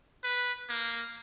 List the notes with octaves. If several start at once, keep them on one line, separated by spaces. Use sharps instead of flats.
B4
A#3